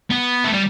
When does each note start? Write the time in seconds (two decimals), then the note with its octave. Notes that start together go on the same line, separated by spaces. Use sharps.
0.10 B3
0.44 A3
0.53 G3